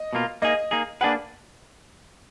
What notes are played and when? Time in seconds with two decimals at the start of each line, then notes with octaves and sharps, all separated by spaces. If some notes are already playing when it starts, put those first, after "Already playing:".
Already playing: D#5
0.13 B2 A#3 F4
0.42 A#3 D#4 G#4 D#5
0.71 A#3 D#4 G#4
1.01 A#3 D4 G#4 B4 F#5